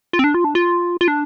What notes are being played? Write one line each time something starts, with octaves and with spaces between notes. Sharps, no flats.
F4
C4
D4
F4
D4
F4
F4
D4